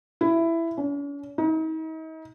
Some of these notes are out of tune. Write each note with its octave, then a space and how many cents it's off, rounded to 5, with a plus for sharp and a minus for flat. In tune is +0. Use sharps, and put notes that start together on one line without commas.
E4 +10
C#4 +45
D#4 +40